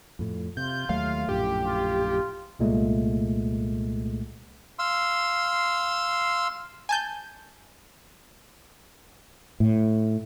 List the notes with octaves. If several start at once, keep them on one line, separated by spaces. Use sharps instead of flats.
F2 A2
C3 F4 G6
D#2 F#3 A3 F5
A#1 F#2 A2 G4
F4
C2 A#2 G#3 A3
F5 C6 E6
G#5 A5 G6
A2